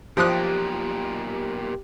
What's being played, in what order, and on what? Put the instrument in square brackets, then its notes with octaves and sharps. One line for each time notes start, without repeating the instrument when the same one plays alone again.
[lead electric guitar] B1 A#2 [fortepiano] F3 D#6 F#6 [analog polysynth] G4